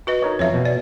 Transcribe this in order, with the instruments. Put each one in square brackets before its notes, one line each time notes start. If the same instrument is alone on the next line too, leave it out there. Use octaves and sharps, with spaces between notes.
[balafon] F#4 B4 D#5
[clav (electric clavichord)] D#4 A#4 C#5
[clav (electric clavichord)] F2 F3 [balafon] C#5 E5
[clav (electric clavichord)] B2
[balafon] D5